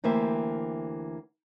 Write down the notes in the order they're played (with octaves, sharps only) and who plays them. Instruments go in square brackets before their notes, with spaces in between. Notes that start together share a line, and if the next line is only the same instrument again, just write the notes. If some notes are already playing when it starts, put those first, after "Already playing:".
[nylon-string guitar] D2 E3 A#3 G4 C5 E5